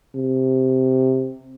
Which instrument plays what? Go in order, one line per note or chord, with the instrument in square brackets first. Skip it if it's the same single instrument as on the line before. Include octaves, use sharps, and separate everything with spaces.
[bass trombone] C3